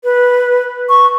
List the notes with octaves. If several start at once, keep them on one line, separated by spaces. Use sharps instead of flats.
B4
C#6